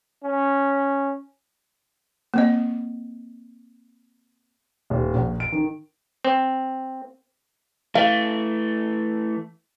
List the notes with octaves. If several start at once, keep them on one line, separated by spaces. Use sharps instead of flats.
C#4
A#3 C4 D#5
D#1
A#1
D7
D#3
C4
E3 A3 F5